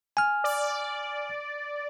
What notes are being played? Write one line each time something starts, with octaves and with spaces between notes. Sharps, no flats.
G#5 F6
D5